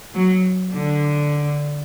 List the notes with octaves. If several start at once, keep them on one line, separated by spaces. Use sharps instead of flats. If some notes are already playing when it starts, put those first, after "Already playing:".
F#3
D3